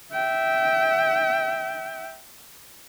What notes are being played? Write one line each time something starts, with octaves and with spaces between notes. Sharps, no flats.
E5 G5